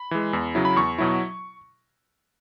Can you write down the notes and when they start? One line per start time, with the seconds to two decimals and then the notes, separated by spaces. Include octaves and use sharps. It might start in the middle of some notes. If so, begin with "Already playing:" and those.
Already playing: B5
0.11 E3 G#3
0.33 E2
0.55 C#3 F#3 E4
0.65 B5
0.76 E2 C#6
0.98 B2 F#3 E4